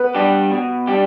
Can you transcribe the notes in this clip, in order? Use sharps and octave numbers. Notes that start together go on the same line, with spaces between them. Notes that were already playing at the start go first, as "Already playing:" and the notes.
Already playing: B3 B4
G3 D4 G4
B2
G3 D4 G4